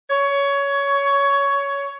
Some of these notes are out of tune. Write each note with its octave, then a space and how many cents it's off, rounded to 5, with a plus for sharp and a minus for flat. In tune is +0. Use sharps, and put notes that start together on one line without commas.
C#5 +15